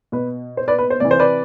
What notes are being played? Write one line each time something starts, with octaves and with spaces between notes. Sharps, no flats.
B2 B4
C5
B4 D5
B4
C5
C3 E3 D5
C5
B4 D5